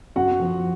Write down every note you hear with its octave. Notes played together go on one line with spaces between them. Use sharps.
F#2 F#4 F#5
F3